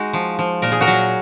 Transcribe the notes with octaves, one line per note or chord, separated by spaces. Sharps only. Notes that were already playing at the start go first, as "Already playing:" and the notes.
Already playing: G#3 D#4 F#4
F3
F3
A#2 A#4
G#4
F#4 A#4
F#3